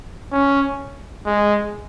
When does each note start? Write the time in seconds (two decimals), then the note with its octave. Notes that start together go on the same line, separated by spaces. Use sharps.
0.32 C#4
1.26 G#3